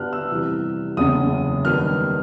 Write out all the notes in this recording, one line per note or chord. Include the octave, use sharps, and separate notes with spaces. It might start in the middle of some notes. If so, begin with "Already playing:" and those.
Already playing: G2 D3 G3 B3 F6 F#6
E6
F2 C3 E3 G3
F#1 E2 C#3 D#6
G2 D#3 G3 B3 F6